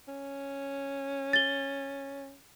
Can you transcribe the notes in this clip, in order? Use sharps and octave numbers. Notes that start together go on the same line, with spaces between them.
C#4
A6 G7